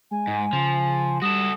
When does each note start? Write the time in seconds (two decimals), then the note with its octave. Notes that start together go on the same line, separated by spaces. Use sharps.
0.11 G#3 G#5
0.27 G#2
0.53 C#3 F3
1.22 G3 F#4 A4 D#6